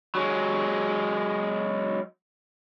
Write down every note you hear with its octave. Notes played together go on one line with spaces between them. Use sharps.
F#3 G#3